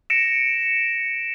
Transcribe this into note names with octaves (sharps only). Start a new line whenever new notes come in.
A#6 C#7 D7 E7